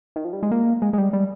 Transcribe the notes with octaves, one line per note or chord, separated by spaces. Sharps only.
D#3
F3
G3
G#3
A#3
G#3
G#3
G3
G3